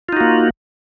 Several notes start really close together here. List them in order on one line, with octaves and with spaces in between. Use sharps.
F4 D#4 F#4 A#3